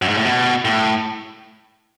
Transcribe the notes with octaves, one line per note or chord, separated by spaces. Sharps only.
F#2
G#2
A2
B2
A2